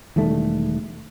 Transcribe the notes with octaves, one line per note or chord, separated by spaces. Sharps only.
E1 D#3 G3 A3